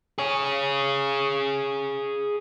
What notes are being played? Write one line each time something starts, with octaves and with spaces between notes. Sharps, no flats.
G#4 C#5